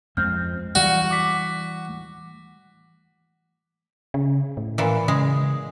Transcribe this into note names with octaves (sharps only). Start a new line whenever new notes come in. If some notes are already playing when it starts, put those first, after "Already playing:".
F2 G#3 C4 F6 G6
E3 G3 F#4 D5 F5 C#7
D6 B6
C#3
A2
A#2 E3
C#3 G#3